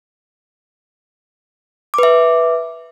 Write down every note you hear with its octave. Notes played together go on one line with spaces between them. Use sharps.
B4 E5 D6